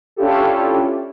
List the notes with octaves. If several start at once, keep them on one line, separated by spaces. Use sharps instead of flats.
C#4 D4 E4 F4 G4 A4